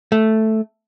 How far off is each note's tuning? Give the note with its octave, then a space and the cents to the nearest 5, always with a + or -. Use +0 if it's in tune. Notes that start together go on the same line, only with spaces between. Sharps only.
A3 +0